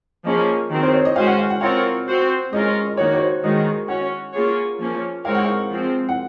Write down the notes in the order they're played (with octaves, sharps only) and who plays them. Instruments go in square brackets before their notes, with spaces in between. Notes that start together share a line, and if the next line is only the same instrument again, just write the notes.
[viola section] F3 A#3 C#4 G#4 [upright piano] D#5
[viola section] D#3 F#3 C4
[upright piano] C5
C#5
D#5
[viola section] G#3 C#4 F#4 C5 [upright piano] F5
[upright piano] F#5
F5
F#5
[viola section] C4 F4 A#4 C#5 [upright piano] F5
[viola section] C4 F#4 C5
[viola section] G#3 C#4 F4 A#4 [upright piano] D#5
[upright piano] D#5
[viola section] D#3 A#3 D#4 F#4 [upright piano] C#5
[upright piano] C#5
C5
[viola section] D#3 G#3 D#4 F#4 [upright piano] D#5
[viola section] C#4 F#4 C#5 [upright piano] F#5
[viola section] A#3 C#4 F4 G#4 C#5
F3 A#3 C#4
[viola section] G#3 C4 D#4 A#4 C#5 [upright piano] F5
[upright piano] F#5
F5
[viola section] F3 G#3 C4
[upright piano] F#5